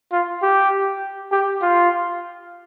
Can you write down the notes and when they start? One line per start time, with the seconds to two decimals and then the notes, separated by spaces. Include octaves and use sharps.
0.12 F4
0.42 G4
1.32 G4
1.62 F4